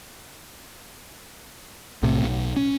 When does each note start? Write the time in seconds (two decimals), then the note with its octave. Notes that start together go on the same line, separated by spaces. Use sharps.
2.03 B1 A2 C3
2.23 B1
2.57 C#4